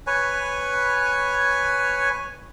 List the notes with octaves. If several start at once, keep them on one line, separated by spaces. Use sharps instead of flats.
B4 C#5 G#5